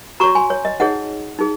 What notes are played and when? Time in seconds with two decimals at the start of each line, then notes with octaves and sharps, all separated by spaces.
0.20 F#4 C#5 A#5 C#6
0.35 G#5 C6
0.50 C#5
0.65 D#5
0.80 D#4 G#4 C#5 D#5 F#5
1.39 D#4 G#4